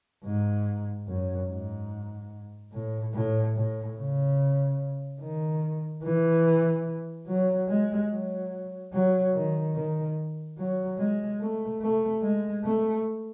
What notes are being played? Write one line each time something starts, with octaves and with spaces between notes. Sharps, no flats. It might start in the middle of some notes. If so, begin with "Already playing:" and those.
G#2
F#2
G#2
A2
A2
A2
C#3
D#3
E3
F#3
G#3
F#3
F#3
D#3
D#3
F#3
G#3
A3
A3
G#3
A3